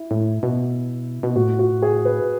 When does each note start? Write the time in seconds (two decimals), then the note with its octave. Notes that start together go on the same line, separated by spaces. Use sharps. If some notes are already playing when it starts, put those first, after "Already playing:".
Already playing: E4
0.11 A2
0.43 B2
1.23 B2
1.36 A2 F#4
1.59 F#4
1.82 G#4
2.05 B4